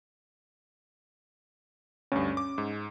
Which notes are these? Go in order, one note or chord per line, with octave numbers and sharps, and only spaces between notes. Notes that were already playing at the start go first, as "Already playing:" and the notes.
D2 G2 C#4
D6
G#2